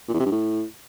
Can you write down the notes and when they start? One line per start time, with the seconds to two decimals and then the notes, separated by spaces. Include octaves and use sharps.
0.08 A#2
0.14 E2
0.20 C3
0.26 G2
0.32 A2